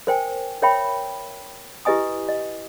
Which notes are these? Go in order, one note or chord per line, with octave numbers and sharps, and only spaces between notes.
A#4 C5 G5 G#5
A#4 C#5 E5 G5 B5
E4 G4 B4 D#5 G#5 D#6
D#5